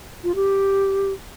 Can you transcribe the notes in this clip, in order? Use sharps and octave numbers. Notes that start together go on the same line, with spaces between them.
F4
G4